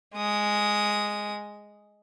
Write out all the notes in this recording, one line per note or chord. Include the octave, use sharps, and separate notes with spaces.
G#3 D#6